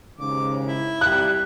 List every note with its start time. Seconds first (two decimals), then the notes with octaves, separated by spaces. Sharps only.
0.19 D#2 G#2 C#3 D6
0.65 E4
1.01 G3 F#6